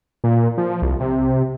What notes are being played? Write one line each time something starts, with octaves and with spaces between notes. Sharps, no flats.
A#2
F3
C2
C3